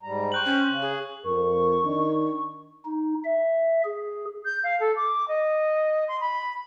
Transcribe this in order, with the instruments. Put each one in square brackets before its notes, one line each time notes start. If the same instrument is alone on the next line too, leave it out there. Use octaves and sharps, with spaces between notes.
[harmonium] G#2 G3 A#5
[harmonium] C5 G5 [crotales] C#6 F#6 F#7
[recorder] C#4
[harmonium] C#3 [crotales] F#7
[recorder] G#4
[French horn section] F2 A#4 [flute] C#6
[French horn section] D#3 D4 D#4
[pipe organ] D#4
E5
G#4
[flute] G6
F5
A4
D6
D#5
C6
B5